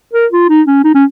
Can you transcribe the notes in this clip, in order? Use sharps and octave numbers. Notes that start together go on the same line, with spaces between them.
A#4
F4
D#4
C#4
D#4
C#4